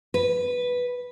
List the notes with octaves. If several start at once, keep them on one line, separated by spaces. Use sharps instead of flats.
B4